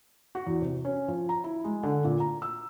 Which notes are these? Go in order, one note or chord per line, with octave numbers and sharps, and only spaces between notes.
F#4
E2
C3
C#4
F3
A#5
E4
G#3
D3
A#2
A#5
E6